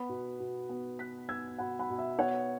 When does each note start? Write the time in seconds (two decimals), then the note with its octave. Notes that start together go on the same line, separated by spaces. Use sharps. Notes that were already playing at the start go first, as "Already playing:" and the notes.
Already playing: B3 F#5 B5
0.09 B2
0.40 B2
0.69 B3
0.99 B3 F#6 B6
1.29 B3 E6 G#6
1.58 B2 F#5 B5
1.79 F#5 B5
1.90 B2
1.98 E5
2.19 B3 C#5 F#5